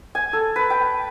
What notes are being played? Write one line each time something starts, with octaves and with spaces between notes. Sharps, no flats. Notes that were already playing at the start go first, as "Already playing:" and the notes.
G#5
A4
B4
G5